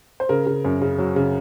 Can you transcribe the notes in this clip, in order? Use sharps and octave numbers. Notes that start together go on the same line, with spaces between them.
C5
C#3 A#4
C#3
F#2
C#3
F#3
C#3